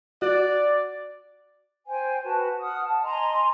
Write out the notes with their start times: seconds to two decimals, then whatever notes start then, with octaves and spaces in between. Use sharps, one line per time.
0.22 F#4 D5
1.87 C5 G5 G#5
2.24 F#4 B4 A5
2.60 F#5 D#6 F6
2.83 A5
3.03 D#5 G#5 A#5 C6